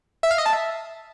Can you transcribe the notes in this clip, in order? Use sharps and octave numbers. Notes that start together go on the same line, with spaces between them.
E5
F5
D#5
A5
E5